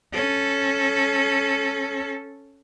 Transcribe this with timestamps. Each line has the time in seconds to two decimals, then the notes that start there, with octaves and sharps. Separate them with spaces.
0.13 C#4 A4